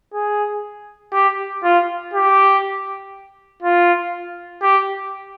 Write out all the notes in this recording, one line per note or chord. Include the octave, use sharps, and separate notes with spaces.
G#4
G4
F4
G4
F4
G4